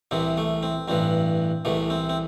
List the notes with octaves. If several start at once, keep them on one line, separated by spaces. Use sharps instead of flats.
C2 C3 E3 C4
A3
C4
A1 G2 E3 C4
C2 C3 E3 A3
C4
C4